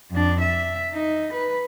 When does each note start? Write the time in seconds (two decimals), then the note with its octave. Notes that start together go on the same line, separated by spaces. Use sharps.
0.11 F2 D4
0.41 E5
0.93 D#4
1.33 B4